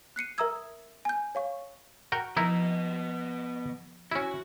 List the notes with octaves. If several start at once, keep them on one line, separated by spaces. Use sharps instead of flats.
F#6 C7 C#7 D#7
A#4 E5 A#5 D#6 E6 G#6
G#5 G6
C#5 F5 C#6
F#4 A#4 G5
F3 B3 D#4 E4 A#4 D#5
C#4 E4 F#4